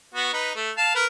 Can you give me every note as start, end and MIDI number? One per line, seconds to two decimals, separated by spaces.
0.15 0.33 59
0.15 0.33 66
0.33 0.51 63
0.33 0.51 71
0.55 0.70 57
0.77 0.93 77
0.77 0.93 81
0.95 1.05 70
0.95 1.05 71